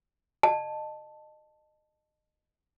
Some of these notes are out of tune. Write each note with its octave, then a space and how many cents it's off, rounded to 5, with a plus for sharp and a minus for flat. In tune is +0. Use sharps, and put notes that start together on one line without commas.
D#5 -25 A5 +0